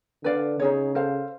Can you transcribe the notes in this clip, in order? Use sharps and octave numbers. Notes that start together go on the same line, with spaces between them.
D3 B4 D5 F5
C#3 D#4 G#4 C#5
A4 C5 F5